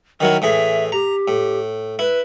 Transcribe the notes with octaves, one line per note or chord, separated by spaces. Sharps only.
D#3 F#3 E4 A#4
A2 E3 G#4 E5
G4 A#5
A2
E4 B4